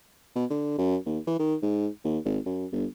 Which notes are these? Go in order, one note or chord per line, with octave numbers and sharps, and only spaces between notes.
B2
D3
F#2
D#2
E3
D#3
G#2
D#2
G#1
F#2
G1